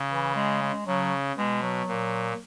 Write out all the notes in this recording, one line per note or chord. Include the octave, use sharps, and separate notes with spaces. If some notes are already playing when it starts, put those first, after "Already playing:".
Already playing: C#3
E3
G#3
G#3
C#3 F#3
B2 G#3
F#3
A#2